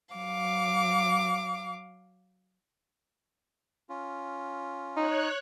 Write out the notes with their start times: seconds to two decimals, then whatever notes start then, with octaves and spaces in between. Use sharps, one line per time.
0.13 F#3 F5 D6
3.89 C#4 F4
4.97 D#4 C#5 F#6